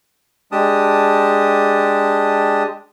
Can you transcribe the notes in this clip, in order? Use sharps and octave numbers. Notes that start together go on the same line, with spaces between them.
G#3 D4 G4 A5 D#6